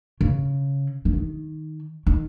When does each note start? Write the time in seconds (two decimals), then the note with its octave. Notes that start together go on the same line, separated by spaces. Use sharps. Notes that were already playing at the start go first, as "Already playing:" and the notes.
0.21 C#3
1.05 E3
1.13 D#3
2.07 D#3